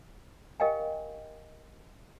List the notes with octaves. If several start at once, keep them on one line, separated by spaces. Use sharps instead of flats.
G4 A#4 D#5 F5 G5 G#5